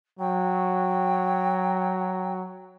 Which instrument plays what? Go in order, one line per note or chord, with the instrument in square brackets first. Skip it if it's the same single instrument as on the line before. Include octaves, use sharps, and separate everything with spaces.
[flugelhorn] F#3 [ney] G5